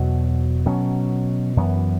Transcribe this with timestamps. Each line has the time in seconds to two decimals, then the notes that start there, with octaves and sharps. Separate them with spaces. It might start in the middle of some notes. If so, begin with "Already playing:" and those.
Already playing: E2 B2 F#3
0.66 B2 F#3 C#4
1.57 F#2 E3 B3